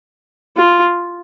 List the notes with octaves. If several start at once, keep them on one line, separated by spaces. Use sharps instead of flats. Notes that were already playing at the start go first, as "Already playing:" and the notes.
F4